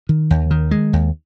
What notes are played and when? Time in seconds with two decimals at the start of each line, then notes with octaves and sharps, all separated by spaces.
0.09 D#3
0.30 D#2
0.51 D#3
0.71 G#3
0.93 D#2